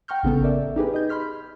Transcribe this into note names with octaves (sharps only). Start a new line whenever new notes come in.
F#5 G5 A#5 C#6 F6 G6
A1 C#3 B3 A4
A#4 D5 E5
D#4 G4 G#4 B4
D#5 G6 G#6
B5 C6 F6 B6